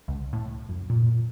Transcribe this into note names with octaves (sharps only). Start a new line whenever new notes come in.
C#2
A2
F#2
A#2